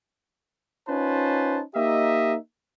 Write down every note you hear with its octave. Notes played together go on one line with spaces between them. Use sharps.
C#4 D#4 F4 B4 C5 A5
A#3 D#4 G4 D#5 E5